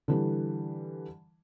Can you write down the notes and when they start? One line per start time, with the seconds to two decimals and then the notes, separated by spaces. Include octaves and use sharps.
0.08 D3 E3 G3